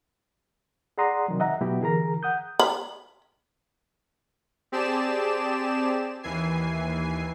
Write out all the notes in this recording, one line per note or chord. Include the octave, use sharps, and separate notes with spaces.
G#4 D5 F#5 A#5 C6 D#6
C3 D#3 F#3
D#5 E5 F#5 A#5
B2 F#3 B3 E4 F#4 G4
D3 E3 G#4 A#4 A#5
F#5 D#6 G6
B5
C4 G4 G#4 D5 A5 E7
D#2 E3 G#5 C7